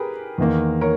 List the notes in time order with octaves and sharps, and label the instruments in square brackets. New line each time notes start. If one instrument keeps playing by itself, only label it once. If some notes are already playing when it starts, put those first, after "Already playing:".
Already playing: [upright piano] G4 G#4 A#4 B4
[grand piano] E2 D#3 A#3
[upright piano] A#4 C#5